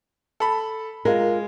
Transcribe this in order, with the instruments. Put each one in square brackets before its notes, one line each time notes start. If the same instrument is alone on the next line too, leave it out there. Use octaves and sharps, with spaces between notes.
[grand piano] A4 B5
[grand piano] G#3 [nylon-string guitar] F4 A#4